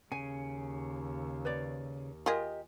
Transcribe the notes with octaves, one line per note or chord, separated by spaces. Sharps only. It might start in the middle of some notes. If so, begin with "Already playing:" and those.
D#2 C#3 G#5
B4 C#5 D5
F4 G4 G#4 A#4 D#5